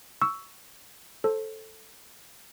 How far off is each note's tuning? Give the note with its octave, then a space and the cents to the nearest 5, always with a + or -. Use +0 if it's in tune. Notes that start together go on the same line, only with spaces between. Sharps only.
C#6 +15 E6 +0
A4 +0 C5 +25